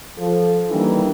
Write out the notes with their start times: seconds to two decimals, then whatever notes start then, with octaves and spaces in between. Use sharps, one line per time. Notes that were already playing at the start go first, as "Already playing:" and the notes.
0.18 F3 A4
0.70 D#3 E3 G3 A#3 D4